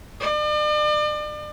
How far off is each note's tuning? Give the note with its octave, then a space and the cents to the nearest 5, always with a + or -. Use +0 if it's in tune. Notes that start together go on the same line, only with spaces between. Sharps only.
D5 +40